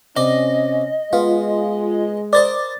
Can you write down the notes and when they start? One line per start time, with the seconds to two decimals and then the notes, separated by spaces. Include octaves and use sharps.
0.16 C3 C#4 D5 D#5
1.13 G#3 B3 F4
2.33 A#4 C5 D5 D#5 A6